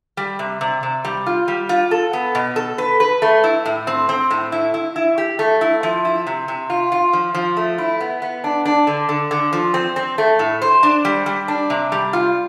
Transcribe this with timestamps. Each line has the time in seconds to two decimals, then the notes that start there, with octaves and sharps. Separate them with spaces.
0.17 G3
0.39 C3
0.61 C3
0.83 C3
1.05 G3
1.26 F4
1.48 G3
1.69 F4
1.91 A4
2.13 B3
2.35 B2
2.56 A4
2.78 B4
3.00 B4
3.22 A3
3.44 E4
3.65 A2
3.87 C4
4.09 C4
4.31 A2
4.52 E4
4.74 E4
4.96 E4
5.18 G4
5.39 A3
5.61 E4
5.83 F3
6.05 E4
6.27 C3
6.48 C3
6.70 F4
6.92 F4
7.13 F3
7.35 F3
7.57 A3
7.78 E4
8.00 B3
8.22 B3
8.44 D4
8.65 D4
8.87 D3
9.09 D3
9.31 D3
9.53 F3
9.74 C4
9.96 C4
10.18 A3
10.39 A2
10.62 C5
10.83 D4
11.05 G3
11.26 G3
11.48 D4
11.70 C3
11.92 G3
12.13 F4